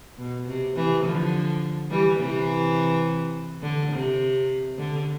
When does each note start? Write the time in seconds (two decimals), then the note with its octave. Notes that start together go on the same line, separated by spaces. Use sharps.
0.18 B2
0.48 C3
0.76 C3 E3
1.04 D3 F3
1.91 E3 G3
2.19 C3 E3
3.62 D3
3.92 C3
4.78 D3